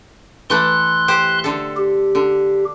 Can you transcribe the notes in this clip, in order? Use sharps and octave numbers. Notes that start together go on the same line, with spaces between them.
E3 A3 A4 C6 F#6
G4 C5
D3 A4
G4
D3